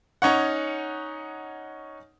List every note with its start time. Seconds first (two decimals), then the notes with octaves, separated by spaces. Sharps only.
0.22 C#4 D#4 C#5 F#5